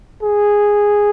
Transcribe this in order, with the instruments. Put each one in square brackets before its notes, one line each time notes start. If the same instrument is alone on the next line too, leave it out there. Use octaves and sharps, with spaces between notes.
[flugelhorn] G#4